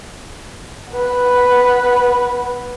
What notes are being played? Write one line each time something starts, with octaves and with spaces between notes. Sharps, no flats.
B3 B4